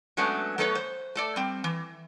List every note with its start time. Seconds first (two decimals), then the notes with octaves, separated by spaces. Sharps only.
0.17 F#3 G#3 A3 B3 C#4 D4
0.58 F#3 A3 B3 A4 B4 C#5
0.75 C5
1.15 A3 A4 D5
1.36 G3 C4
1.64 E3